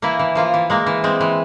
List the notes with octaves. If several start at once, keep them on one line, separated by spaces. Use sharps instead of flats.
E3 A#3 E4
E3
F3 A#3 F4
E3
G#3 A#3
E3
G#3 C4
E3